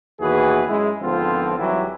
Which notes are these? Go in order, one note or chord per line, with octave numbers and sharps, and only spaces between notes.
D#2 B2 E3 F#4 G#4 B4
F#2 G#3 E4
G#1 D3 F3 B3 C4 F4
G#1 E3 F#3 G3 E4 G4